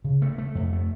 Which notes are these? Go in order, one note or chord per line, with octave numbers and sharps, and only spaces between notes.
C#3
A3
A3
F2
A3